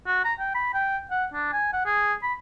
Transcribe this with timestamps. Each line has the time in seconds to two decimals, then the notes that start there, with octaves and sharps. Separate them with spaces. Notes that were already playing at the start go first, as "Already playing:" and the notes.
0.07 F#4
0.24 A#5
0.39 G5
0.54 B5
0.74 G5
1.11 F#5
1.33 D4
1.53 G#5
1.73 F#5
1.85 G#4
2.23 B5